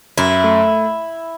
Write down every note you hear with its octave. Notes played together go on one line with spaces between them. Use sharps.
F#2 E4
A3